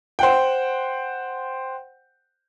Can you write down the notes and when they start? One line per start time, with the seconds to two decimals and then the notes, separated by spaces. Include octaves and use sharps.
0.19 C5 F#5 G5